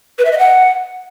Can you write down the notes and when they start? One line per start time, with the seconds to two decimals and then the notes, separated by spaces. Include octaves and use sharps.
0.18 B4
0.25 E5
0.32 D#5
0.38 F#5